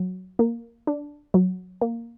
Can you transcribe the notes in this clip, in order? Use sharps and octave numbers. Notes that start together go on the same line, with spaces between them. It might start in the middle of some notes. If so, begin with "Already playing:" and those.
Already playing: F#3
A#3
D4
F#3
A#3